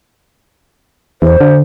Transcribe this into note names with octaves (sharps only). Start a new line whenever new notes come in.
E2 C5
D3